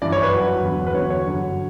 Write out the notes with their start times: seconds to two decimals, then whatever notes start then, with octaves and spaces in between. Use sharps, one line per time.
0.02 G2 E3 D5
0.12 C#5
0.23 B4
0.33 G2 F#3
0.63 E2 D3 F#3
0.87 B4
0.94 E2 D3 F#3 C#5
1.10 C#5
1.25 G2 D3 F#3